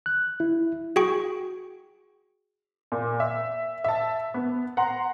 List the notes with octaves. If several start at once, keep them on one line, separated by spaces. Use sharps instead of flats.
F#6
E4
F#4 G#4 G5 C#6
A#2
E5
E5 A5
B3
F#5 A#5 C6